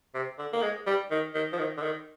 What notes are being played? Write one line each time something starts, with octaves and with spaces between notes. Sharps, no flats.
C3
D3
A#3
G#3
G3
D#3
D#3
F3
D#3
D3
D#3